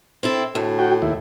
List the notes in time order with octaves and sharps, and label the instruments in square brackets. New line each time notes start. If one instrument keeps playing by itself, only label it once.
[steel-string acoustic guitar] C4 E4 A4
[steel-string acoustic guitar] D2 [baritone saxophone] A2
[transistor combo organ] F#4 G5
D#2 E4